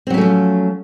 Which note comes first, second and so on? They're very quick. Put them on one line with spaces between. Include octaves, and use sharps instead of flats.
C4 F#3 C#4 A3 F3